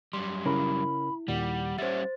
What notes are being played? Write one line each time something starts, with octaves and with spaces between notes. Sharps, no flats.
F#2 G3 C6
C#3 C#4 E4 A#4 B5
D#2 A#2 D#3 G3 F#5
G3 C#4 C5 E5 A6